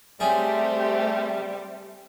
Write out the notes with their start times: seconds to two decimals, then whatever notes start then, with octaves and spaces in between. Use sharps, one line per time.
0.20 G3 A3 C4 C#4 G4 G#4 E5